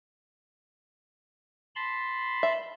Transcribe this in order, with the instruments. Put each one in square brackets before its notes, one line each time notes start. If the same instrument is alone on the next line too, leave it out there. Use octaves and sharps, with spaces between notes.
[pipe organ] A5 B5 C6
[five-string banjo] E5